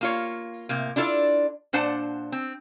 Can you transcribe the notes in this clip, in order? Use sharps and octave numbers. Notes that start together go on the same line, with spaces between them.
A#3 F4 C#5
A2 C3 A#3
D4 E4 F4 A4 D5
A#2 D4 C5 F#5 A5
C4